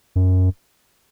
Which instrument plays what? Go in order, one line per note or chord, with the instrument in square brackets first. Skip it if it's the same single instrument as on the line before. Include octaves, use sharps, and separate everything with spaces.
[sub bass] F#2